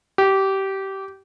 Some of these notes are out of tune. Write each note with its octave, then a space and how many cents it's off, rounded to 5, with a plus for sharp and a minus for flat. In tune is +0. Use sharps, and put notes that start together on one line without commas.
G4 -20